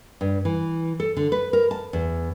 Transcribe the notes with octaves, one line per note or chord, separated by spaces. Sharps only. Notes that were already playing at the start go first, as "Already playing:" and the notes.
G2
E3
A4
D3
B4
A#4
A5
E2